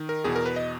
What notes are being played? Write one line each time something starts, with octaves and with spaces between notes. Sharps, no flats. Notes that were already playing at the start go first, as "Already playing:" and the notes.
Already playing: D#3
A#4
E2 B2 G#4
A#4
B4
D#5